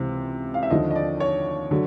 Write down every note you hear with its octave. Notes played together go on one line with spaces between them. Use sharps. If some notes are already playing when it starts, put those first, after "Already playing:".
Already playing: C#2 C3 E3
F5
E5
D#2 D3 F3 D#5
D#5
D5
C#5
D3 F#3